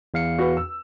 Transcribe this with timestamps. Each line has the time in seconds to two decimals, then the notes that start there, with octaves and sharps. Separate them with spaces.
0.14 E2 F5 C#7
0.39 F#4 B4
0.57 E6